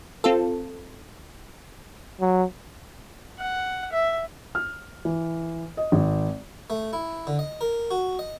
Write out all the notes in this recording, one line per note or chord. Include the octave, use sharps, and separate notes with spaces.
C4 F4 A4
F#3
F#5
E5
F6
E3
D#5
G#1
A3
E4
D3
D#5
A#4
F#4
D#5